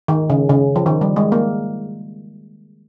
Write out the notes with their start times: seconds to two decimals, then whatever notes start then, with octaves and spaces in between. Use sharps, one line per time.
0.08 D#3
0.30 C#3
0.49 C#3
0.76 F3
0.86 D#3
1.01 G3
1.16 G#3
1.32 A#3